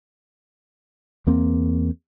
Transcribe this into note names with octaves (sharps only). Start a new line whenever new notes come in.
E2 A#3 C4